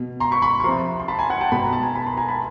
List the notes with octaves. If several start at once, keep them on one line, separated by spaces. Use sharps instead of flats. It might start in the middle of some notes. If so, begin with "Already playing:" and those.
Already playing: B2
A#5 C6
B5 C#6
B5 C#6
C#6
C3 F3 A#5 C6
C6
A5 B5
G#5 A#5
F#5 G#5
G5 A5
B2 B5
A#5
A5
G#5 A#5
A5 B5
A#5 C6
G#5 A#5
A5 B5